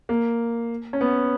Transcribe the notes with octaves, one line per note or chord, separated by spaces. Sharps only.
A#3
C#4
B3